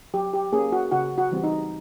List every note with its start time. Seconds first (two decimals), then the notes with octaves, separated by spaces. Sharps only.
0.14 F#3 G4
0.33 G4
0.52 A#3 C#4 G#4
0.72 F#4
0.92 C#3 F#4
1.18 F#4
1.31 E3 G3 C4
1.44 D#4